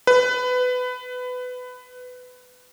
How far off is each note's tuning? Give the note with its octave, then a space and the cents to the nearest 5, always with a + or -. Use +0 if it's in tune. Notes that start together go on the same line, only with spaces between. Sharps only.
B4 +20